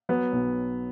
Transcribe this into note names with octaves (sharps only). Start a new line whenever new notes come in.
F#3 B3
B1